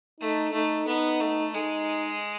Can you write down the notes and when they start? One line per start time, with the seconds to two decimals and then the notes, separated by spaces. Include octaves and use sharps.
0.20 A3 D#4
0.53 A3 D#4
0.87 B3 D#4
1.21 A3
1.54 G#3 D#4